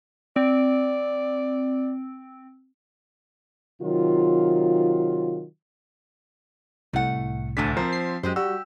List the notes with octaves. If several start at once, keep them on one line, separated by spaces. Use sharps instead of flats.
C4 D5
C3 D#3 F#3 F4
C2 A2 A3 F#5
D2 D3 E3 A3 B6
F3 C4 A#4 C5
C7
F#2 G#3 G4 C5
G3 F#4 G4 E6